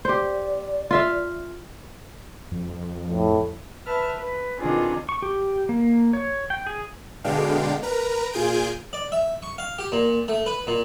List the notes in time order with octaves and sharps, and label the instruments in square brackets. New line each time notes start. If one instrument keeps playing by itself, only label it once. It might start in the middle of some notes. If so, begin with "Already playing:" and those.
[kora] G4 C5 [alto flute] D5
[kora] F4 E5 F5
[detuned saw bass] F2
[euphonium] A2
[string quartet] B4 E5 A5 F6
B4
B2 D#3 C4 D4 F4 G#4
[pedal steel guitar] C#6
G4
A#3
C#5
G5
G#4
[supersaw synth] B2 D3 G#3 D4 F5 G5
A#4 B4 A#5
A#2 F4 G#4 G#5 G6 D7
[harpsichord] D5
E5
C#6
F5
G4
A#2
A3
B4
A#2